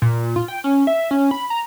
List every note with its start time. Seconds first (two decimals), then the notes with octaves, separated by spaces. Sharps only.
0.02 A#2
0.36 F4
0.48 G5
0.64 C#4
0.87 E5
1.11 C#4
1.31 B5
1.50 A#5